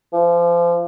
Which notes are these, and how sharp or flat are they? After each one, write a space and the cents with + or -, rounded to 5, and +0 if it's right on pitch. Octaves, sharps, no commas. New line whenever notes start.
F3 -30